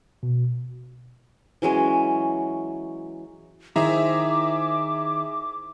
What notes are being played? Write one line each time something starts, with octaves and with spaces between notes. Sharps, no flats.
B2
E3 F#3 G#3 C#4
D#3 E4 G#4 C5 E5 A#5 D6